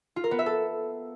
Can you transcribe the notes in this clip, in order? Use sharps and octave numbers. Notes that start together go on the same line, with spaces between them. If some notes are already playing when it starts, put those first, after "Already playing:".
F4
A#4
B3
E5
A4